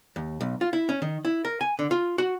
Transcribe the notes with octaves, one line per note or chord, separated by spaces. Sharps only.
D#2
B1
F4
E4
C#4
D#3
E4
A#4
G#5
D3
F4
F#4